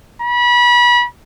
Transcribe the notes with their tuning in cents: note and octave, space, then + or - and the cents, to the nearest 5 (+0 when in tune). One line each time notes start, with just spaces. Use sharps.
B5 -30